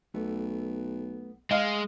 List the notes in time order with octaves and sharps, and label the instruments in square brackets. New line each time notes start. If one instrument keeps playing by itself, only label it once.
[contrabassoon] B1 [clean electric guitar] A3 B3
[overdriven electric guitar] G#3 [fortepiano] D#5 F5